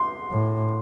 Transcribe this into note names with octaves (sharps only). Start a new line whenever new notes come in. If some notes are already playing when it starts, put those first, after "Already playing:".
Already playing: C6
A2